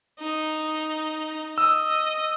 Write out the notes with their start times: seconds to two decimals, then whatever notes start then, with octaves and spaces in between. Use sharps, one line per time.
0.19 D#4
1.58 D#5 E6